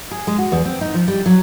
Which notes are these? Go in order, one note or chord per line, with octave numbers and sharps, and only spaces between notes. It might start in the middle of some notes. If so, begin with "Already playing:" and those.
G#4
G#3
F#4
E2
C4
D#4
F3
G3
F#3